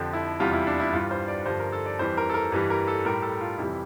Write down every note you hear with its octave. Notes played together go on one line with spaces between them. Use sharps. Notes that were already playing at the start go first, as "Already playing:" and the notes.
Already playing: F2 D3 F3 G4
E4
E2 C3 G3 F4
E4
D4
E4
G2 E3 G3 F4
C5
D5
G2 D3 F3 C5
A#4
A4
D5
F2 E3 G3 C5
A#4
A4
A#4
G2 E3 G3
A#4
A4
A2 G3 A#4
A4
F4
F2 C3 E3 G3 E4